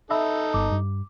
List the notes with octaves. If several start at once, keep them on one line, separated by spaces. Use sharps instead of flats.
D#4 A4 E5 B5 E6
G1 D6
G2